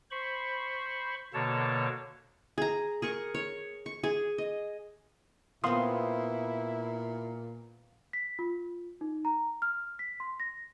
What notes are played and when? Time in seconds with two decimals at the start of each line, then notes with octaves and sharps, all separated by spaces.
0.11 C5 B5 C#6
1.34 B2 D3 A#3 A4 C#5 A5
2.58 G#4 A#5
3.02 G#4 A#4 C#6
3.34 C#5
3.86 C#6
4.03 G#4
4.38 D#5
5.64 A#2 B3 C4 E4 F5 C6 D#6
8.13 B6
8.39 F4
9.01 D#4
9.25 A#5
9.62 F6
9.99 B6
10.20 C6
10.40 A#6